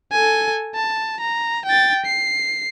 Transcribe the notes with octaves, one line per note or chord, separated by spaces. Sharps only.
A4 G#5
A5
A#5
G5 A6
C7